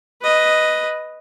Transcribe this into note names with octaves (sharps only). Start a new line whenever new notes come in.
B4 D#5